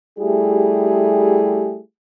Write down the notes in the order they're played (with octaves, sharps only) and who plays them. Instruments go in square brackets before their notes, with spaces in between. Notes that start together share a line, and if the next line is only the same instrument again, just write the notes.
[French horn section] G3 A3 E4 G4 G#4